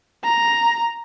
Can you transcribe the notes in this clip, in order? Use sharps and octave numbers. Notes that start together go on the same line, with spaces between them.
A#5